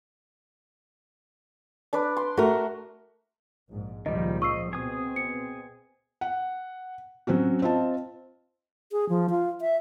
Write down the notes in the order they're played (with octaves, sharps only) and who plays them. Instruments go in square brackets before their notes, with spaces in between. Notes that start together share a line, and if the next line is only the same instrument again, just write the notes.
[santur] D4 B4 D5
C6
[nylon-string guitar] A3 A#4 [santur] F#4
[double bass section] A#1 G#2
[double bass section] C#2 A#2 F3 [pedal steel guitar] D#3 G3 [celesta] D#5
[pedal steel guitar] D#5 [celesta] C#6 E6 C7
[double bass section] B2 C4 [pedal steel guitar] G#4 D#6
[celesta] C#7
[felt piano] F#5
F#3 C4 C#4 F#4
C4 F4 D#5 A5
[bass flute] G#4
F3
F4
E5